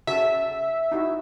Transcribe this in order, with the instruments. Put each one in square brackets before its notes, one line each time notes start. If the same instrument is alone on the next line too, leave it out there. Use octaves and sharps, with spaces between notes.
[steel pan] C#3 F#4 A4 [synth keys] E5
[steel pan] D#4 E4 F#4